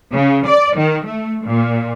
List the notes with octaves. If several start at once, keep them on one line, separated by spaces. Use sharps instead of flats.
C#3
D5
D#3
A3
A#2